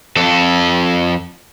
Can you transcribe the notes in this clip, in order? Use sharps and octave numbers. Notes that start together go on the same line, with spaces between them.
F2 A4